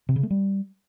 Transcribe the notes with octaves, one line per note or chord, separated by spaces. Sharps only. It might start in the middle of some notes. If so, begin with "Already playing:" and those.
C3
C#3
A3
G3